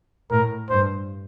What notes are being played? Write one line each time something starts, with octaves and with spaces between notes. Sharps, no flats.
A2 A#4
G2 C5